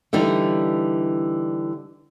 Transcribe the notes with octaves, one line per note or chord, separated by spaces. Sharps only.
D3 E3 G3 D#4